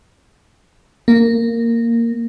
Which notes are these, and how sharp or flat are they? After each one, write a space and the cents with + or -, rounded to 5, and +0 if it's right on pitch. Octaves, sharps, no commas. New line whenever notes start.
A#3 -10